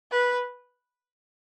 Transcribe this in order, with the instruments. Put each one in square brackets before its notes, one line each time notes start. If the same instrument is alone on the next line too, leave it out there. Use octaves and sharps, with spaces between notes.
[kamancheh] B4